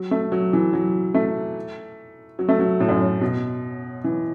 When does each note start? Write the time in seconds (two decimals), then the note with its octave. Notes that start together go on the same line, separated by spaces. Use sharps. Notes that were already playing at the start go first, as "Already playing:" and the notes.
Already playing: F#3
0.11 A3
0.32 F#3
0.53 E3
0.73 F#3
1.14 A3
2.39 F#3
2.48 A3
2.59 F#3
2.80 A2
2.89 F#2
2.99 A2
3.21 B2
4.04 E3